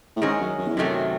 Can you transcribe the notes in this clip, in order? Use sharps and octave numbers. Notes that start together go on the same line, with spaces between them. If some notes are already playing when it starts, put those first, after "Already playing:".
A2
G#2 D#3 G#3 C#4 G#4
F#2
F#2
E2
F#2 C3 D#3 F#3 A3 C4